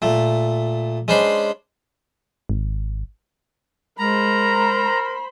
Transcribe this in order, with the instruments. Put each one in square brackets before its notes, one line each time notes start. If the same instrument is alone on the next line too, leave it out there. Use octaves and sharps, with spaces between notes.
[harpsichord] A#2 A3
G#3 C#4 D4 C5 B5 C6
[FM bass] G#1
[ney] G#3 [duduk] A#4 [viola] C5 B5 [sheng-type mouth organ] A#5